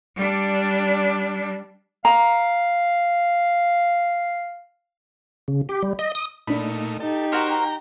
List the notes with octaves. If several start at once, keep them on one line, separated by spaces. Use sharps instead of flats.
G3 D4
F5 A#5
C#3
G4
G3
D#5
D#6
A#2 A3 D4 D#4 B5
D#4 G4 A4
F#4 A#4 C5 G5 A#5